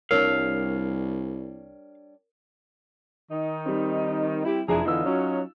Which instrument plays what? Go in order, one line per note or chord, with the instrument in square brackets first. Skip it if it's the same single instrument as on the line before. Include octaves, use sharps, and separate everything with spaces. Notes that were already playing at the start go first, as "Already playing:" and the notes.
[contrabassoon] C2 [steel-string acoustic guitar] G3 D4 C#5 [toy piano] A#4 [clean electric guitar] F5
[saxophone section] D#3 D#4
[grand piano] G3 C4
[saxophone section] E4 G4
[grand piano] F1 F2 A#5 [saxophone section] D4 E4 G#4
[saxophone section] E2 D3 E3 [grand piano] D#4 F4 E6
[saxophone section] F#3 C#4